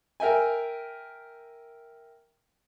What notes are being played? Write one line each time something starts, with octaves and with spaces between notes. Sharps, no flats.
A#4 E5 G5 G#5